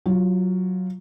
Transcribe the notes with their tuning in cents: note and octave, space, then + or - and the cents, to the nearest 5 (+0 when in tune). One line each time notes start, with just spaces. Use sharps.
F#3 +0 F4 +0